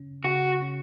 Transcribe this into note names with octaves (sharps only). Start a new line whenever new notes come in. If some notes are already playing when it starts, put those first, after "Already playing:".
Already playing: C#3 C#4
C#3 F#4
C#4